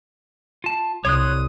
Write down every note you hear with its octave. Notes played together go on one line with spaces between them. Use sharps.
F4 A5
C2 C#5 C6 D#6 F#6